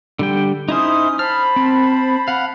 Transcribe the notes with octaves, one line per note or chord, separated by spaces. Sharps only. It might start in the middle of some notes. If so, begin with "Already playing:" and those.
D3 G3 G5
C#4 D#4 E4 C5 D#6
C5 A5 B5 F6
C4
F5 F#5